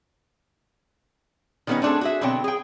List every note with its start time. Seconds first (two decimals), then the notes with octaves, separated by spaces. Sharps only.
1.67 D#3 G3 A3 B3 C#4 D#4
1.82 A3 C4 D4 G#4 A4
2.01 F#4 G#4 E5
2.21 B2 D3 F#3 C4 G5
2.44 G#4 G5